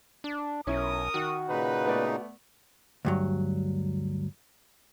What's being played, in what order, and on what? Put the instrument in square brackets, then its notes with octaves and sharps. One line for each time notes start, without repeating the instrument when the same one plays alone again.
[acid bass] D4
[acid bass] B1 [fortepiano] C#4 E4 [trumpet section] A#4 D#6
[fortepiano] D#3 [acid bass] F#4
[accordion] A#2 C#3 D#4 [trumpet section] B4
[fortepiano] A3 B3 D5
[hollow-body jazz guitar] D2 G2 F#3